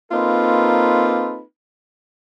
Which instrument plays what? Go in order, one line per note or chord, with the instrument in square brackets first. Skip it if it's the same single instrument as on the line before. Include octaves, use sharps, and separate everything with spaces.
[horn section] A#3 C4 D#4 F4 A4 B4